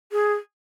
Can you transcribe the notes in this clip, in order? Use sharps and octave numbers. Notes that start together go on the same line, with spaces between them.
G#4